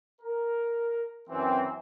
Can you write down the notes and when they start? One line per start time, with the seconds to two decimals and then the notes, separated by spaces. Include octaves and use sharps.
0.21 A#4
1.29 F#2 E3 C4